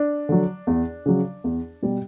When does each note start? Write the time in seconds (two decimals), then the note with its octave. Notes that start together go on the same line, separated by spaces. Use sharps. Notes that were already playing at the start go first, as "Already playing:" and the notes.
Already playing: D4
0.29 D3 F#3
0.67 E2
1.06 C#3 F#3
1.44 E2
1.82 B2 G3